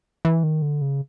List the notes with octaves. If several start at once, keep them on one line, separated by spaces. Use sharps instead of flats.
E3
D#3
D3
C#3